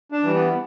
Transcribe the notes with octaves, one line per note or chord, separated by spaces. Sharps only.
D4
E3 G3
B3